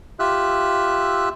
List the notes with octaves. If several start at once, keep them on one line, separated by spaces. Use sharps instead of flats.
F4 G4 E5 E6 F#6